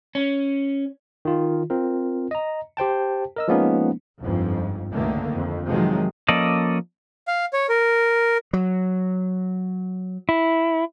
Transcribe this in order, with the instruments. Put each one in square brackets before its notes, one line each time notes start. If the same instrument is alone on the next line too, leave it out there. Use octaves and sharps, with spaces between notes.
[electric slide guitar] C#4
[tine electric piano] D#3 F4
C4 F4 A#4
D#5 A#5
G4 C5 G5 A5
A#4 D#5 E6
F3 G#3 A#3 B3 C#4 D#4
[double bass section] G1 F2 G#2
C#2 D3 D#3 A3 A#3
F2
C3 D#3 F3 F#3 G#3
[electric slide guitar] F3 A#3 C#4 A4 D5 D#5
[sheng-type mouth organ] F5
C#5
A#4
[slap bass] F#3
[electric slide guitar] E4